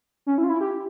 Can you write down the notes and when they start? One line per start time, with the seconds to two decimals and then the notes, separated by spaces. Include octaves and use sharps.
0.26 C#4
0.38 E4
0.44 F4
0.49 E4
0.61 G4